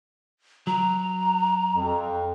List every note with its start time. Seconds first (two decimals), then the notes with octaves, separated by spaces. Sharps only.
0.67 F#3 A#5
1.75 F2